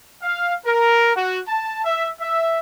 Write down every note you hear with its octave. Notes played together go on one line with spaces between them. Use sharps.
F5
A#4
F#4
A5
E5
E5